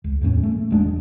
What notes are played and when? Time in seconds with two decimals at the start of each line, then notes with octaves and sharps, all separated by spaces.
0.04 C#2
0.21 E2 A2 A3 C#4
0.43 A3
0.70 E1 G#3 D4